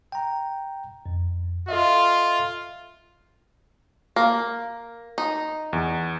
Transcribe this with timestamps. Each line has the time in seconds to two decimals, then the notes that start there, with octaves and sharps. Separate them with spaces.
0.12 G5 A#5
1.06 F2
1.69 F4 A4 D#5 E5
4.16 A#3 A#6
5.18 D#4
5.73 E2